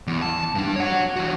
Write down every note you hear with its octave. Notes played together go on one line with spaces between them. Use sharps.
E2
A5
G2 D4
C#5 F#5
E3 F#4